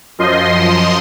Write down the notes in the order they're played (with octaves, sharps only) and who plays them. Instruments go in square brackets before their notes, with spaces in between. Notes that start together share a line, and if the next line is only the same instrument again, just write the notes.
[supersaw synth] F#2 F3 D#5 C6